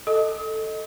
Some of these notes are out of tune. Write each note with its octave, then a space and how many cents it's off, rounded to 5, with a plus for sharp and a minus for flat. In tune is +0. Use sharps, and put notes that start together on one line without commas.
A4 +0 D#5 +0 D#6 +40